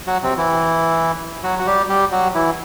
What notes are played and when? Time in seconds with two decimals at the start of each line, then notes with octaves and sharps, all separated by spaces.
0.07 F#3 F#4
0.23 C3 C4
0.37 E3 E4
1.44 F#3 F#4
1.59 F#4
1.66 G3 G4
1.89 G3 G4
2.12 F#3 F#4
2.35 E3 E4